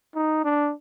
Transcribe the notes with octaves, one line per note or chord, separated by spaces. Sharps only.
D#4
D4